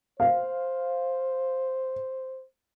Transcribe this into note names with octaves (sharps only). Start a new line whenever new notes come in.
C5 F5